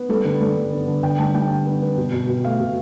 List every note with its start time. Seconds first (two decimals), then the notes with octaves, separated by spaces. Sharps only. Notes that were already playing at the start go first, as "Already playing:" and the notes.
Already playing: B3
0.09 G3 A4
0.25 D3 B4
0.41 G3 A4
0.56 D3
0.72 B3
0.87 D3
1.03 D3 G5
1.19 G3 A5
1.34 G3 G5
1.51 D3
1.66 B3
1.82 B3
1.97 B2
2.13 B2
2.28 B2
2.44 A3 F5
2.60 B2